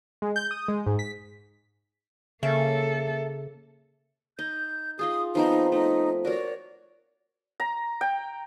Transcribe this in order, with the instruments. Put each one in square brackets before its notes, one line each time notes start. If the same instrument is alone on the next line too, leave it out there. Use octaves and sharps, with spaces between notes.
[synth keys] G#3
G6
D#6
G#3
G#2
B6
[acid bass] C#3 [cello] A#3 A4 [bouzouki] E5
[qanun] D#4 [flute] G6
[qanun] D#4 F4 G#4 [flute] D#6
[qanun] F3 B3 C4 [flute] D#4
[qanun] A3 [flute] D#4
[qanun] F#4 A#4 C#5 [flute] D5
[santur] A#5
G5